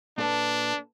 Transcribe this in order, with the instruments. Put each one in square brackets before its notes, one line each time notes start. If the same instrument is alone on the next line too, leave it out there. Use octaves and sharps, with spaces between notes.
[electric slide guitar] A#2 A4 B4 [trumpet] D4